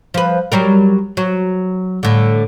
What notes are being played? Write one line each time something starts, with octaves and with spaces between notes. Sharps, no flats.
F3 B4
F#3 G3 A#4
F#3
A2 D3